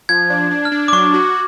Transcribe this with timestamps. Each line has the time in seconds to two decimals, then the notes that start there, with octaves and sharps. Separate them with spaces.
0.09 F3 G#6
0.30 D4
0.51 D4
0.65 F6
0.72 D4
0.88 D6
0.93 F#3 C#6
1.14 F#4